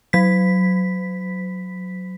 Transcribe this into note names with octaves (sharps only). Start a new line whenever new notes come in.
F#3 B6